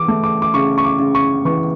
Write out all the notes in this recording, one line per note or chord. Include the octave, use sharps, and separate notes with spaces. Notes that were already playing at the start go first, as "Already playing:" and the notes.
Already playing: E3 D6
A3
D6
D6
C#3 C#6
C#6
D6
C#3
C#6
E3 C#6